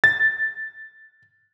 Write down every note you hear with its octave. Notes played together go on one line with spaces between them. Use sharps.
A6